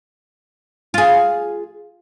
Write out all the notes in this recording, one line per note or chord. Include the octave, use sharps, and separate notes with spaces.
F4 G#4